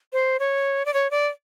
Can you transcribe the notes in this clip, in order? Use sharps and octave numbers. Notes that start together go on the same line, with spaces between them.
C5
C#5
D5
C#5
D5